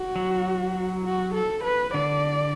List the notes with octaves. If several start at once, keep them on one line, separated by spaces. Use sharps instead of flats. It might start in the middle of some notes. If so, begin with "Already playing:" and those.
Already playing: F#4
F#3
F#4
A4
B4
D3 D5